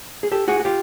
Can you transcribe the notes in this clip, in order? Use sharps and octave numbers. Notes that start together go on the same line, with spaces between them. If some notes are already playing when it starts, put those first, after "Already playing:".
G#4
G4 A4
F#4 G#4
F#4
F4 G4